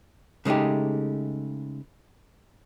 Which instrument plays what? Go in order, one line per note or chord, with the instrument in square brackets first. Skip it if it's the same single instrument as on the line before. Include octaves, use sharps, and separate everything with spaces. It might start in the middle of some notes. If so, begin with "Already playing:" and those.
[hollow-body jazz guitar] C#3 G#3 A3 D#4 G4